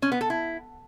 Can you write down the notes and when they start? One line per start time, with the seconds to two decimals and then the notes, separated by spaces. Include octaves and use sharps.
0.02 C#4
0.12 B3
0.21 A4
0.30 E4